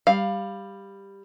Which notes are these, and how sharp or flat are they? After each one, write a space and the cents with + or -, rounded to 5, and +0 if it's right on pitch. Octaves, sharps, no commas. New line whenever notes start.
G3 +10 F5 +0